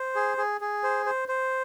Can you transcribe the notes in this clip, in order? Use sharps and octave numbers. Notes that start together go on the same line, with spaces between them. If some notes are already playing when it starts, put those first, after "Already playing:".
Already playing: C5
G#4
G#4
G#4
C5
C5
C5